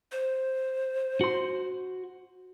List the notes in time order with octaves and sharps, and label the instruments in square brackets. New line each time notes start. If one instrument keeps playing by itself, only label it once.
[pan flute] C5
[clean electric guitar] F#4 C6